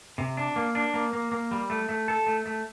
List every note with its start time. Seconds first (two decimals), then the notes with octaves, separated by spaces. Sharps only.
0.18 C3
0.37 D4
0.56 A#3
0.75 D4
0.94 A#3
1.13 A#3
1.32 A#3
1.51 G3
1.70 A3
1.89 A3
2.08 A4
2.27 A3
2.46 A3